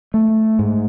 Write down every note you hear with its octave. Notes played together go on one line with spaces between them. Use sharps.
A3
G#2